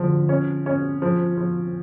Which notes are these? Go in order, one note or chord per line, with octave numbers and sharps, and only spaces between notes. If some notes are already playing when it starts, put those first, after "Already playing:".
Already playing: D3 F3
C#4
C#4
F3
F3